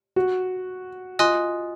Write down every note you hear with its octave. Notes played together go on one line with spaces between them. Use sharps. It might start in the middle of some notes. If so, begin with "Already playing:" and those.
F#4
F4 D#5 G#5 C6 D#6 F#6